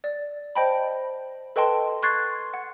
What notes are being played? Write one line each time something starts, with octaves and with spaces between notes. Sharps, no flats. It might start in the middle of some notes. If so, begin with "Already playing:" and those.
D5
C5 D#5 G5 A5 B5
A4 B4 D#5 G5 A5 C6
C6 C#6 F#6 G#6 A6 C7
F#5